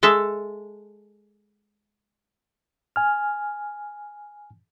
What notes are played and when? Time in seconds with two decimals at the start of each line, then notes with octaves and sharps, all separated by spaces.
0.03 G#3 A4 E5
2.96 G#5 F6